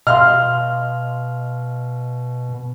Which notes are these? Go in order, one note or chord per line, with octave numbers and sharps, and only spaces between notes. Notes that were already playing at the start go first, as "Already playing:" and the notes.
B2 D#5 F5 C6 F6